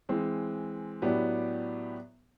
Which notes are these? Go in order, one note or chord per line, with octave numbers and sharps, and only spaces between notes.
E3 G#3 C4
A2 F#3 B3 D4 G4